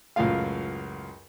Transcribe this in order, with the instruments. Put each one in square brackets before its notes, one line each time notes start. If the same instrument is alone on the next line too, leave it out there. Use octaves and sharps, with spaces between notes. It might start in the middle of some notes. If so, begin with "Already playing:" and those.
[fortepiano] C#2 F#2 A2 F4 F5